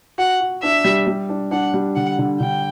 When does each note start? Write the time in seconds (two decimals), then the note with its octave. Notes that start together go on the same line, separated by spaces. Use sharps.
0.18 F#4 F#5
0.41 F#4
0.63 D4 E5
0.85 G3
1.07 G3
1.29 D4
1.51 D4 F#5
1.74 G3
1.95 D3 F#5
2.19 D3
2.40 D3 G5